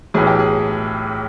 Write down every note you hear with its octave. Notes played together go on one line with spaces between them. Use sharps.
B1 A2 E3 G#4
G4
G#4